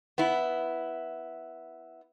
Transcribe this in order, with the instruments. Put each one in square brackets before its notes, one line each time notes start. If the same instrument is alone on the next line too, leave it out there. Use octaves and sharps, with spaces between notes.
[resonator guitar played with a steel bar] B3 E4